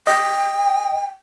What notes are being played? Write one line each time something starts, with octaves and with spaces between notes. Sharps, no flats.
D#5 G5